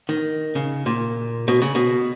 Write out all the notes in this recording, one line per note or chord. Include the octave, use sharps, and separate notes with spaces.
D#3
C#3
A#2
B2
C#3
B2